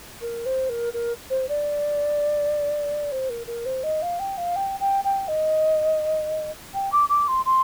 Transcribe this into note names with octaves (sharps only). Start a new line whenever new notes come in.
A#4
C5
A#4
A#4
C5
D5
C5
A#4
A#4
C5
D#5
F5
G5
F5
G5
G5
G5
D#5
G5
D6
D6
C6
C6